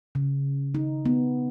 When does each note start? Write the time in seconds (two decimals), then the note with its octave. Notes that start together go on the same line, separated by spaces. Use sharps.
0.15 C#3
0.75 D#4
1.05 B3